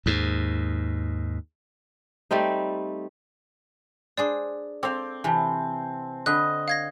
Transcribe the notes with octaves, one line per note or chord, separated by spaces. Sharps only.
D#2 G#2
G3 A3 C4 D#4
D4 G#4 C5 D5
C4 A4 F5 D6
C3 E3 G#5 A5
D3 B4 D#5 F#6
F5 G#6 A#6